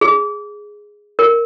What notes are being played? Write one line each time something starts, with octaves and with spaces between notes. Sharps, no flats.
G#4
A#4